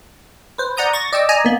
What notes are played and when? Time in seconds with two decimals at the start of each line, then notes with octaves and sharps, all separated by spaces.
0.58 B4 C5
0.77 D5 F#5 A#5 D#6 G6
0.93 C#6 A6 A#6
1.13 D5 D#5 G5 E6
1.29 D5 D#5 G#5 A#5
1.44 A#3 B3